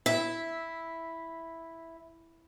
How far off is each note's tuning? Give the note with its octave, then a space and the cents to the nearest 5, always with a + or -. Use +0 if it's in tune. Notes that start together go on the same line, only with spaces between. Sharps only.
E4 +0 E5 -5